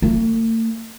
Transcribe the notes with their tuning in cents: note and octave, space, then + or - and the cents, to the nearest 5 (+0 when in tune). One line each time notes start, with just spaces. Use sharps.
A3 +45